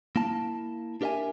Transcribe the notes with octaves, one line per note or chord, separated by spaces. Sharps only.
A#3 E4 A5
D4 G4 A#4 D#5 E5 G#5